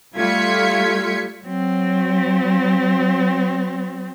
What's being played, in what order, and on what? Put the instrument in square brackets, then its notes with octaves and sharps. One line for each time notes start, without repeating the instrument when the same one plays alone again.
[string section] G3 A3 F4 G#6 B6 C#7
[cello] F#3 C4